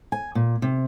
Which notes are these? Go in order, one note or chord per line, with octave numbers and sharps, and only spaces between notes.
G#5
A#2
C3